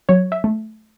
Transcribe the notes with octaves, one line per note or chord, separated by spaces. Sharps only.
F#3 C#5
E5
A3